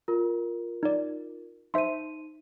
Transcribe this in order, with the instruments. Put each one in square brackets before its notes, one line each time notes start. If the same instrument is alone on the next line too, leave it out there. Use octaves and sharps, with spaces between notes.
[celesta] F4 A#4
[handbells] D#4 D5
[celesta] D#4 D#7 [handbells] C5 E5 C6